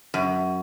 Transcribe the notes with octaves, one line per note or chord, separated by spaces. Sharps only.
F#2